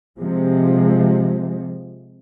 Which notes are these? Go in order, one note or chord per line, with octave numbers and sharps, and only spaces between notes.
C3 F3 G#3